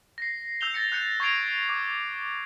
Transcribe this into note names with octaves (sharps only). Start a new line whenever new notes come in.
A#6 C7
E6 G6 F7 G7
A6 A#6 C#7
F#6 G6 C#7
C#6 G#6 A#6 C7 D7 F7
D6